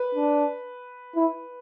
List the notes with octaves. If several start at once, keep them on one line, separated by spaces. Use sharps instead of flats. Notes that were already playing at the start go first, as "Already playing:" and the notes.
Already playing: B4
D4
E4